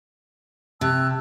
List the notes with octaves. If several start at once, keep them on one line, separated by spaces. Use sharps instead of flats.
C3 A5 E6 F#6